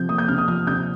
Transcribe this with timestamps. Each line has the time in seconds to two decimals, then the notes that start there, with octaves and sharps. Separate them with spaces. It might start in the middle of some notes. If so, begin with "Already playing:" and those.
Already playing: C3 F3 G6
0.09 A#3 D#6
0.18 G6
0.28 C3 F6
0.38 D#6
0.48 F3 F6
0.67 C3 G6